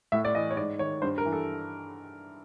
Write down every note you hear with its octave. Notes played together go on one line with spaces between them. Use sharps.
A2 E5
D5
E3 D#5
C#5
G#2 D5
D#3 C#5
G2 C5
A#4
E3
A4